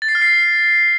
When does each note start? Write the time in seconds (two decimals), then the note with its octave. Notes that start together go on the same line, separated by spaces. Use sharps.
0.02 A6
0.08 C7
0.15 F6
0.22 C7